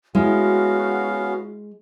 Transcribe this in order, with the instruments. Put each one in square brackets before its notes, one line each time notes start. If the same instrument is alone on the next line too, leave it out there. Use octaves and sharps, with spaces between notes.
[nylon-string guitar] G#3 [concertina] B3 C#4 F5 [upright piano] E4 [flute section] F#4